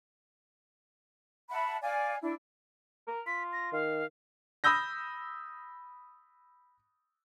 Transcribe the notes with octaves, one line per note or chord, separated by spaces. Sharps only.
E5 F#5 A5 B5
D5 F5 G#5
D4 E4
A#4
F4 B6
A#6
D#3 F5
B5 D#6 E6 G6 A#6